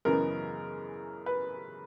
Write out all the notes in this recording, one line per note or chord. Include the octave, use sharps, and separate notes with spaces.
F#2 C#3 E3 G#3 B3 A#4
B4